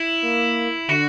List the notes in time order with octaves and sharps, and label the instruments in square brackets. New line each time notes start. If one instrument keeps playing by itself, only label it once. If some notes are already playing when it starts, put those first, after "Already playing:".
Already playing: [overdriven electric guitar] E4
[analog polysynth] A#3
[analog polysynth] D3 [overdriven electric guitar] F#4